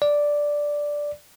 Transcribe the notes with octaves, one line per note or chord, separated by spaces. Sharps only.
D5